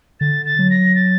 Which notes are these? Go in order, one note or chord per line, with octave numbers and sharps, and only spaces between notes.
D3 A6
A6
F#3
A#6
A6